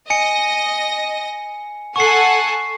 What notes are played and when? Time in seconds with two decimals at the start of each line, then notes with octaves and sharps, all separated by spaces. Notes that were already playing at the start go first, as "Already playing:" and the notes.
0.10 D#5 G#5 A#6 C#7
1.96 A4 F#5 G#5 C#6 C7